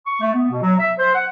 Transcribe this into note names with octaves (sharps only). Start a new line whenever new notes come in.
C#6
A3
B3
B2
F#3
E5
C5
F#5